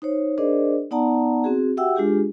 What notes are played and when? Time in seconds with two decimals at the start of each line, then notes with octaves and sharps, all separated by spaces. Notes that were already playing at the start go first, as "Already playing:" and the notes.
0.02 D#4 C5 C#5
0.38 D4 G#4 A#4 C5 D5 D#5
0.91 B3 D#4 D5 F#5 A5 A#5
1.44 C4 F#4 G#4
1.77 F#4 G4 E5 F#5 G5 E6
1.95 G#3 D4 F4 G4 G#4